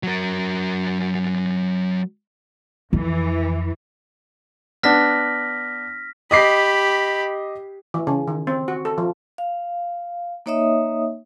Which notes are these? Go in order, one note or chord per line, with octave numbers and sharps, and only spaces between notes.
F#3 A#4
F2 E3
B3 D4 F6 A#6 B6
G4 D#5 B5 D6 C7
E3
C#3
D#3
C4
F#4
A4
F3
F5
A#3 D#4 C#5 D#5 E5 D#6